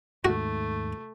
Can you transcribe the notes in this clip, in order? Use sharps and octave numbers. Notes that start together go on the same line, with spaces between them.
D#2 G#2 A3 F#4